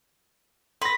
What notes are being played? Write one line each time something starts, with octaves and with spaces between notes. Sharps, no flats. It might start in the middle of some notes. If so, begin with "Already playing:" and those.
B4 C6 A#6